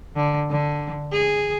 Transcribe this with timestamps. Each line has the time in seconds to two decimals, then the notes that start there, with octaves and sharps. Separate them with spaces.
0.16 D3
0.50 D3
1.12 G#4